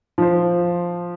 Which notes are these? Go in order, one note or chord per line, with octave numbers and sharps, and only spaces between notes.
F3 C5